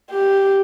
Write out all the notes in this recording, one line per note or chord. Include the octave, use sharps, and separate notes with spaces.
G4